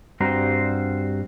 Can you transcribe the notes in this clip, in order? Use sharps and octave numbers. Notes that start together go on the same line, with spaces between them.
G2 G3 C4 F#4 C5 A#5